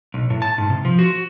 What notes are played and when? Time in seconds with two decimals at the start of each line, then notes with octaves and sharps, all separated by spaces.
0.14 B1
0.30 A2
0.42 A5
0.58 G#2
0.70 C3
0.85 F3
0.99 F#4